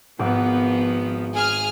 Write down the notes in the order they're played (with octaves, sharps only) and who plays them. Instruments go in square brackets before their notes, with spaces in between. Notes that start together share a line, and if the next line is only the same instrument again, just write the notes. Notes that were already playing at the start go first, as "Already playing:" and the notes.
[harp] G#1 F#5 D6 [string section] F3 B3
[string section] G#4 G#5 F6